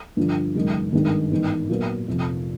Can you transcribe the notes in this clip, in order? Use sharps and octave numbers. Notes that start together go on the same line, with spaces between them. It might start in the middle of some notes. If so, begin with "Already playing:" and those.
G2 D3 F3
F#1 F#2 D#3 G#3
G#1 G2 D#3 G#3
A1 G#2 D#3 G#3 B3
A#2 F#3 B3
F1 F2 C3